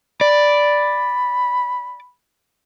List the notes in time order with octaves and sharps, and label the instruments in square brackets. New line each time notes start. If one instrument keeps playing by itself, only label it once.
[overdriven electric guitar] D5 [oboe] B5